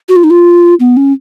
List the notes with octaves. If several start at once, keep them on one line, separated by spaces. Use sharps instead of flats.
F#4
F4
D#4
F4
B3
C#4